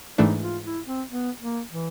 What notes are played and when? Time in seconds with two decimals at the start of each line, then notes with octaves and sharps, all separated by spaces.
0.17 G#2 E3 A3 D4 D#4
0.41 F4
0.64 E4
0.86 C4
1.09 B3
1.40 A#3
1.70 E3